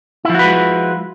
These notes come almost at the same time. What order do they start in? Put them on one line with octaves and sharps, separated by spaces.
E4 F3 F#4 B4 G#3